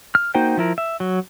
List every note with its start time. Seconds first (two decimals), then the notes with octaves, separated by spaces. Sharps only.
0.15 F6
0.35 A#3 D#4 F#4 C5 G5
0.57 F3 E4 A#4
0.78 E5
1.00 F#3